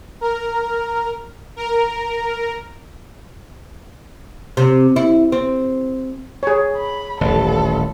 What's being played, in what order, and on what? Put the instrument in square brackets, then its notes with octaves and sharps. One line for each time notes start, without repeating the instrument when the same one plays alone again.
[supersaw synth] A#4
A#4
[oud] C3
E4
C4
[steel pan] G#4 C#5
[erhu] B5
[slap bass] D#1 A1 [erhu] A4